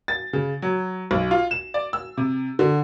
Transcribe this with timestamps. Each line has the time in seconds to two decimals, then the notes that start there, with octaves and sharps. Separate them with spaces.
0.08 A6
0.33 C#3
0.62 F#3
1.11 B1
1.31 F4
1.51 E7
1.74 D5
1.93 E6
2.17 C3
2.59 D3